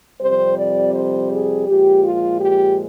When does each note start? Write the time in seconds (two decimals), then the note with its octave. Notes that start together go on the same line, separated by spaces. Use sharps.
0.21 F2 C3 G3 C5
0.58 D5
0.94 C5
1.32 G#4
1.68 A#2 F3 G#3 G4
2.04 F4
2.41 G4